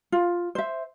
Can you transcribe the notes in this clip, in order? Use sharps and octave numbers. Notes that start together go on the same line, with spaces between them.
F4
C5 E5